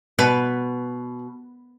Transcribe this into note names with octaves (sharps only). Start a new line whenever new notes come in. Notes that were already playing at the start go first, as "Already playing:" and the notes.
B2 B4